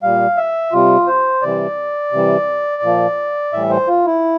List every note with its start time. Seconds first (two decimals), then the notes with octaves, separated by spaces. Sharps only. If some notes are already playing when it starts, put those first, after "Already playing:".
0.03 A#2 G3 F5
0.37 E5
0.72 C3 G3 F4
1.07 C5
1.42 C3 E3 G3 D5
2.12 C3 E3 G3
2.82 A#2 F3
3.53 A2 E3 G3 E5
3.70 C5
3.88 F4
4.06 E4